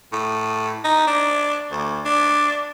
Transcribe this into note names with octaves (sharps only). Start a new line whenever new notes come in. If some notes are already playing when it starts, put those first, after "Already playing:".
A2
D#4
D4
D2
D4